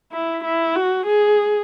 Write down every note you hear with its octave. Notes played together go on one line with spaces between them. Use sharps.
E4
E4
F#4
G#4